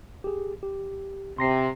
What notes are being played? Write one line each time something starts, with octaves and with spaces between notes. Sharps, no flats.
G4 G#4
G4
C3 C6 A#6 C7